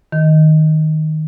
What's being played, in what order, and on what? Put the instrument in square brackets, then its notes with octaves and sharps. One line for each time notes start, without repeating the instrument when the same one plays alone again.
[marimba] D#3